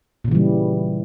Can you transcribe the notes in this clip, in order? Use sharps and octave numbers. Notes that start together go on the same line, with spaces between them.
A#2 C#3 E3 G3